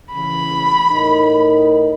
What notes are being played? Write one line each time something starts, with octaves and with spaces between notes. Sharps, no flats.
C#3 E3 B5
A2 D#4 A#4